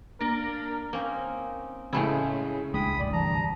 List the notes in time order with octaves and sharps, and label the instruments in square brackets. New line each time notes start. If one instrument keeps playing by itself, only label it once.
[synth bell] A#3 D4 [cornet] A#4
[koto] A#3 [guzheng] C4 C#4 D#4
[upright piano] A2 C#3 [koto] G#3 A3 E4 [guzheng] G#4 B4 F5
[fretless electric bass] D#1 G#3 [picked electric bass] C#2 D4 [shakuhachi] G5 [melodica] B5 D#6
[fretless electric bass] F1 D2 G2 [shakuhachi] D5
[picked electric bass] E3 [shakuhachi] A5 [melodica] A#5